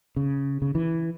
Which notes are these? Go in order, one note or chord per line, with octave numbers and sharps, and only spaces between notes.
C#3
C#3
E3